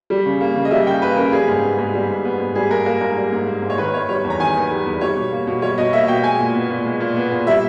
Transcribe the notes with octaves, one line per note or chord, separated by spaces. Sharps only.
G3
C#3
A#3
C#3
D#5
G3 E5
C#3 G5
A#3 B4
C#3 A#4
G3 G#4
G#2
B3
G#2
G3
G#2
B3
G#2
G3 G#4
G#2 A#4
A#3 A#4
G#2 A#4
G3
G#2
A#3
G#2
C#5
D#3 B4
B3 C#5
G3 C#5
E2
A#5
D#3 G#5
B3
G3
E2
G3 C#5
B2
A#3
B2
G3 C#5
B2 D#5
A#3 E5
B2 G5
G#3 G#5
A#2
B3
A#2
G#3
A#2
B3
A#2
G3 E5